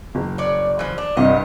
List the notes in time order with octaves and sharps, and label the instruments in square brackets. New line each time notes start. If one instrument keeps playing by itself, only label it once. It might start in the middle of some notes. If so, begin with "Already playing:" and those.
[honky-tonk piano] F#1
[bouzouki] C#5 D5
E3 F3
D4
[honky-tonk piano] C2 G2 [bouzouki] D#5